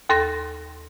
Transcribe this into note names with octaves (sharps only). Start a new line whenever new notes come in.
D#2 A4 C6 A#6